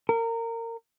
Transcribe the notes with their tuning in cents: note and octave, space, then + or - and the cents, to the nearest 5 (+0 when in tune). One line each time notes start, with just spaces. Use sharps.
A#4 -25